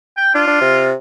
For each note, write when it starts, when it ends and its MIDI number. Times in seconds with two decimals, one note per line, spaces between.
0.17 0.33 79
0.35 0.47 62
0.35 0.87 65
0.47 0.58 62
0.61 0.94 48